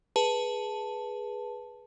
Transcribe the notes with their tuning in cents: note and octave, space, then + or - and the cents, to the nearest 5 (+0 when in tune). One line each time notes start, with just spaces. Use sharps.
G#4 +0 B4 -15 A5 +0